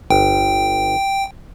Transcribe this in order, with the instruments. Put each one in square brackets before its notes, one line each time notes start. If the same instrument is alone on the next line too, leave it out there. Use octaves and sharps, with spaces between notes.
[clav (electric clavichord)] G1 [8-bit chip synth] G5